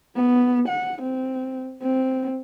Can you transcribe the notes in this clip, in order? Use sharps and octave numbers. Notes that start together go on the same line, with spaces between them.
B3
F#5
C4
C4